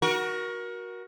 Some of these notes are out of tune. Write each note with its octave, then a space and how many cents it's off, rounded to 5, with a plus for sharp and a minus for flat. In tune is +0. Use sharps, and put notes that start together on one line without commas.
F#4 +0 A#4 +25